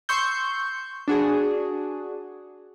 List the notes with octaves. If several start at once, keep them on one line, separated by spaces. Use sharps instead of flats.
C6 C#6 E6 G6
D4 F#4 G#4